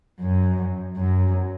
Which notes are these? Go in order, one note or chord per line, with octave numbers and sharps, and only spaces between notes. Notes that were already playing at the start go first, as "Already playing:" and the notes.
F#2
F#2